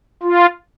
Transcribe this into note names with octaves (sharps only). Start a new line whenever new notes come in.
F4